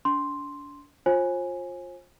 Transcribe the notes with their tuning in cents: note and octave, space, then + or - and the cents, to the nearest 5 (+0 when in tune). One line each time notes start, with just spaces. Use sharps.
D4 -30 C6 +0
F4 +20 C5 +40 G#5 +0